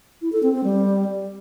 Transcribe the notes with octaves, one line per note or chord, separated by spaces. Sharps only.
E4
A4
C4
C4
G3